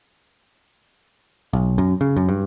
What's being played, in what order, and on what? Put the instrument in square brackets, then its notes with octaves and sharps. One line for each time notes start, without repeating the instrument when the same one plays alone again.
[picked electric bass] B1
F#2
C#3
F#2
G2